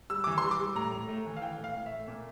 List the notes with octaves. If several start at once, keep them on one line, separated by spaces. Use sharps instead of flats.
G3 E6
E3 D6
C6
G3
D6
G3
A2 A#5
A2
A3
E3
F5
E3 G5
A2
F5
A2
E5
A3
A#2